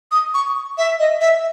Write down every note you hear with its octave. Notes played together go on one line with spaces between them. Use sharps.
D#6
C#6
E5
D#5
E5